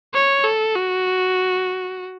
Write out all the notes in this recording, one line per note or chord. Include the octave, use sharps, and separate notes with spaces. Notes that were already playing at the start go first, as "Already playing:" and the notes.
C#5
A4
F#4